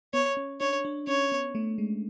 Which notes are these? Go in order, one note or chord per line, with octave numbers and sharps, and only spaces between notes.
B3 C#5
C#4
D4 C#5
D4
C#4 C#5
B3
A3
G#3